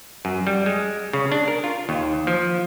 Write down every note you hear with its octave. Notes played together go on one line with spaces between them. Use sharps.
F#2
G3
G#3
C#3
D4
A#4
F4
D#2
F3